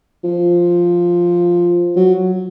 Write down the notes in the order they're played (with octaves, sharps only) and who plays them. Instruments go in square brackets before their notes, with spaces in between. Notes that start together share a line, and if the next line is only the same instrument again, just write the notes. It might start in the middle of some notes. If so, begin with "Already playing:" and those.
[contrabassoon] F3
F#3